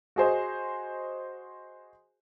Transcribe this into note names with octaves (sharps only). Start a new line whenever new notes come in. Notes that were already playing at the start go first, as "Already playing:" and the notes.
F#4 G#4 C5 D#5